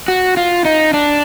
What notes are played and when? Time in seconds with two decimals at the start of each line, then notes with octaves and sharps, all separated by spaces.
0.08 F#4
0.37 F4
0.65 D#4
0.94 D4